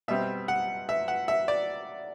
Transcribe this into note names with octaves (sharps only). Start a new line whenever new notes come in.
B2 G3 C4 E5
F#5
E5
F#5
E5
D5